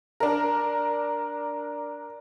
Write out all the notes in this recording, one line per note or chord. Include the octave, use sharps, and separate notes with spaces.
D4 A#4